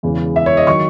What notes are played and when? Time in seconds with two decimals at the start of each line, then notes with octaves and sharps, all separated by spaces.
0.03 E1 E2 C#3 E3
0.36 E5
0.46 C#5
0.57 D#5
0.67 D#3 F#3 C#6